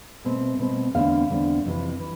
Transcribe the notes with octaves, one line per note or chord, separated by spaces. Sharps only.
B2 A3 C4
B2 A3 C4
E2 D3 A3 C4 F5
E2 D3 A3 C4
F2 C3 E3
E3